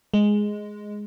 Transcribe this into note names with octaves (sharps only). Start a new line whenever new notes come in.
G#3